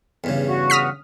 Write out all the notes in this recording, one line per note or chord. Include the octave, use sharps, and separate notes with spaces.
E2 G2 C#3
F#4
D#6 F6 B6